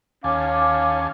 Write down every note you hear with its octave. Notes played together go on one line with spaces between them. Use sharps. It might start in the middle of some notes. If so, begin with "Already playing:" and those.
D#2 C#4 F5 G#5 A5 D6